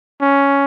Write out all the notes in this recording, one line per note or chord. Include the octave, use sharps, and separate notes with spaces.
C#4